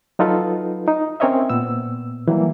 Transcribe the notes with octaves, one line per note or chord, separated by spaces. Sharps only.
F#3 D#4 F4 F#4 A4 B4
D#4
C4 C#4 A#4 C#5 D#5 E5
A#2 B3 E6
E3 F#3 G3 A#3